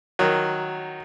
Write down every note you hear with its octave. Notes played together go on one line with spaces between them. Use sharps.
D#3 F#3